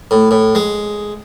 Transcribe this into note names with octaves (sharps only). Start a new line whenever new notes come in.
A2
A2
G#3